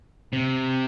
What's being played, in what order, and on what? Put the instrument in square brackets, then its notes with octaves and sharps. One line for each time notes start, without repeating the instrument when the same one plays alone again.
[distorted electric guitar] C3